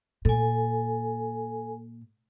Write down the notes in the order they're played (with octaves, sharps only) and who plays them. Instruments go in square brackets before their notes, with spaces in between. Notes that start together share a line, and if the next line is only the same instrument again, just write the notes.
[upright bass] A#2 [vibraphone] A4 G#5